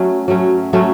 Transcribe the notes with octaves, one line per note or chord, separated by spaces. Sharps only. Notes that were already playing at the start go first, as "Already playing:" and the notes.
Already playing: F#3 A3 C#4
F#3 A3 C#4
F#3 A3 C#4